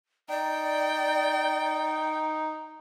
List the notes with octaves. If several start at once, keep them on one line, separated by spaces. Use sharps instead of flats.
D#4 D5 G5